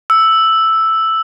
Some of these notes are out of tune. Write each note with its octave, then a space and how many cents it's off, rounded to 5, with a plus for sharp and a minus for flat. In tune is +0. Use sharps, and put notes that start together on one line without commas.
E6 +0